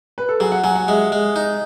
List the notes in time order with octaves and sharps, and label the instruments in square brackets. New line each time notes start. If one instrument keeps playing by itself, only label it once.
[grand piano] B4
A4
[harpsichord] F#3 [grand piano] G#4
[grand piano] F#5
[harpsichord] F#3 [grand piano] G#5
[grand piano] F#5
[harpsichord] G#3 [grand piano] E5
[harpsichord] G#3
D#4